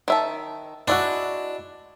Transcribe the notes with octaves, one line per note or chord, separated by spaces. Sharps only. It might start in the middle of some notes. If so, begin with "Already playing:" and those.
D#3 E5 A5
G#3 D4 E4 F#4